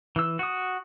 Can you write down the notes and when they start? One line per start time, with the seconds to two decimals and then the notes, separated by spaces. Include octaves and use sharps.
0.16 E3 E6
0.39 F#4 D#6